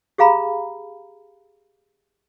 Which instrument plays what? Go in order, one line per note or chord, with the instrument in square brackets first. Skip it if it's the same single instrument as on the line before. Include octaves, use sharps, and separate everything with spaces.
[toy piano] G4 G#4 F5 A#5 B5